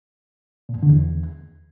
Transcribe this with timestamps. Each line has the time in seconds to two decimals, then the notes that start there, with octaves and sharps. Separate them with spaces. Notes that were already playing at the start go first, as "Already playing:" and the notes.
0.69 A#2
0.76 F2
0.83 D3
0.89 E2